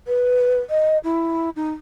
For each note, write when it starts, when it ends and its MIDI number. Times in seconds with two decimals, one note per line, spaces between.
0.07 0.58 71
0.70 0.98 75
1.04 1.50 64
1.56 1.71 63